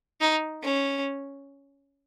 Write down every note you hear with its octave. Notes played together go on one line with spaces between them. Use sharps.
D#4
C#4